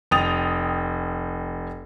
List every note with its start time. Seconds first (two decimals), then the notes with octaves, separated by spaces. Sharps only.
0.11 F1 G5 D#6 A6 F7